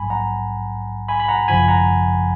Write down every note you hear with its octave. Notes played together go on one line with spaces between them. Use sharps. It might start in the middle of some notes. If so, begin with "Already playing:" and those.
Already playing: A#1 G#2 F#3 G#5 B5
F#5 A#5
G#5 B5
B5
F#5 A#5
G#1 F#2 C#3 F3 G#5 B5
F#5 A#5